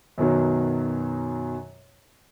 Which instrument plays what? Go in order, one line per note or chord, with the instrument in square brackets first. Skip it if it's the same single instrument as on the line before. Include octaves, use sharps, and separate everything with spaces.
[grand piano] F#2 B2 D#3 F#3